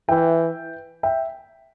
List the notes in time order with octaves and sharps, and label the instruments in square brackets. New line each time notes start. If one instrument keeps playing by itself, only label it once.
[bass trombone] E3 [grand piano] E5 G5
[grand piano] E5 G5